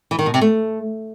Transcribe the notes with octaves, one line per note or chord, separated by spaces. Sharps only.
E3
D#3
B2
C3
A3